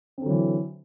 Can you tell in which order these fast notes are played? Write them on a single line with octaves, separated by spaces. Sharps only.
C4 D3 F#3 E3